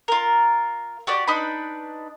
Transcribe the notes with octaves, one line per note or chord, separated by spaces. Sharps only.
F4 A#4
F#4 G4 D5
D4 D#4 B4 B5